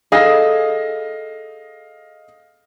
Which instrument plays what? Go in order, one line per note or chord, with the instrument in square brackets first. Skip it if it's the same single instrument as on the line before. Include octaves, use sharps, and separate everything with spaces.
[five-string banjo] G#4 A4 [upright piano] D#5 F5 A#6